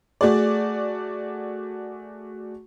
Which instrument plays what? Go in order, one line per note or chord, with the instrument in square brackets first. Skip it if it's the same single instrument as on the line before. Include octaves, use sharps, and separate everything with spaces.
[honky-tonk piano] A3 F#4 G#4 D5